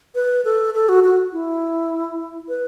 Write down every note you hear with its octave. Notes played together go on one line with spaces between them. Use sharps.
B4
A4
A4
F#4
F#4
E4
B4